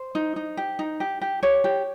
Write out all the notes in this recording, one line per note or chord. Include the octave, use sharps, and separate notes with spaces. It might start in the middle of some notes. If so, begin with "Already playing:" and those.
Already playing: C5
D#4
D#4
G4
D#4
G4
G4
G4 C#5
G4